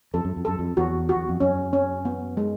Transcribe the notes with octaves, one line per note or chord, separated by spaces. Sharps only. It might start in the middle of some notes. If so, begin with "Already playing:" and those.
F2 A4
F#2
F2
F#2 A4
F2
E2 F#4
F#4
E2
F2
F#2 C#4
C#4
B3
G#3